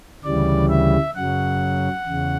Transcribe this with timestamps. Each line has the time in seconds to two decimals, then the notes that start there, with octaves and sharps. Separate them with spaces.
0.24 D2 C#3 E3 G3 D5
0.70 E5
1.15 F#2 C#3 F#3 F#5
2.06 E2 C#3